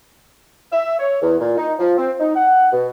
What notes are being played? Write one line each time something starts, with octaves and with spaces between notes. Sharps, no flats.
E5
C#5
E2
A#2
D#4
F3
C4
D#4
F#5
B2